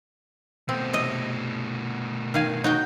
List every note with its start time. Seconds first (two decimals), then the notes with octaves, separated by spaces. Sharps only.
0.69 B2 A3 C4
0.93 C3 D#5
2.34 D#3 F5 G#5
2.64 D#4 F#4 G5